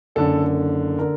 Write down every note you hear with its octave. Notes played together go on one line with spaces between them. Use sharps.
F#1 F#2 D3 A4
D3 A#4